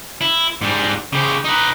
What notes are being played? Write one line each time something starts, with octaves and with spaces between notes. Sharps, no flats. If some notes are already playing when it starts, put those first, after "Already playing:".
E4
G#2 G3
C#3 G4
D#4 B4